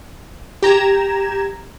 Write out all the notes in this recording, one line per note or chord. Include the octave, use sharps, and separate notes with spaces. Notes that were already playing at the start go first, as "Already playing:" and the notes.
G4 A#5 G#6 E7